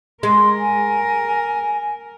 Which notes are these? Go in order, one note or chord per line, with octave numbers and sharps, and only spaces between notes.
G#3 A#4 C6
G#5